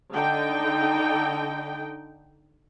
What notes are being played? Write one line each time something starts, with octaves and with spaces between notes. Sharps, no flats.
D3 D#4 G5